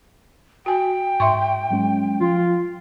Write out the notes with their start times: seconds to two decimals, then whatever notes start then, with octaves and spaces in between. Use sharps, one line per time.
0.66 F#4 G5 G#5
1.20 G#2 E5 C6 C#6
1.71 F#3 G#3 C#4
2.21 F3 F4